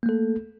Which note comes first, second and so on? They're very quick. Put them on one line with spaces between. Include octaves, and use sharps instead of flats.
A#3 A3 A4